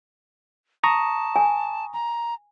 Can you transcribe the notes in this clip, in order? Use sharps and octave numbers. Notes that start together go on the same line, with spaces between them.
A5 A#5 C#6 D#6
G#5
A#5